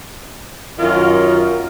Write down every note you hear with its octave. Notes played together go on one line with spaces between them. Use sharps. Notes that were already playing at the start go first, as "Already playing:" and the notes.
F#2 D#3 C#4 F4 A#4